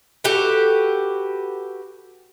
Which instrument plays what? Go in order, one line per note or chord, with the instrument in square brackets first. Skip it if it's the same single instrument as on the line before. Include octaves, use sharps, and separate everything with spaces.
[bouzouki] F#4 G4 A4 B4